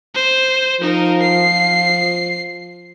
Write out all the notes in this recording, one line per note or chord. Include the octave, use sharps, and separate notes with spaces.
C5
F3 D#4 A#4
C7